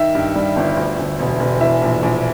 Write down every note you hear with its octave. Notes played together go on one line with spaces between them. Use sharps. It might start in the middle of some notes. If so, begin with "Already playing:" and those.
Already playing: D#3 E5
G2
G3
G1
D2
D2
E1
E1
E3 E5
A#1
A#1